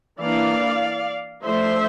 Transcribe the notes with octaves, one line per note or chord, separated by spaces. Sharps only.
E3 A#3 D4 D5 F5
F3 A3 D4 C5 E5